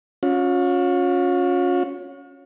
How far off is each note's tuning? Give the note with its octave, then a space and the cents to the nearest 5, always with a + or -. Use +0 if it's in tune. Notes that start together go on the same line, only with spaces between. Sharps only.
C#4 +0 F4 +40